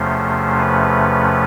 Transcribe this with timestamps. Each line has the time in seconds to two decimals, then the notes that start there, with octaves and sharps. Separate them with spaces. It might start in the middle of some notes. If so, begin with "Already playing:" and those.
Already playing: E2 C3 F3 A3 C#4 C5
0.57 B4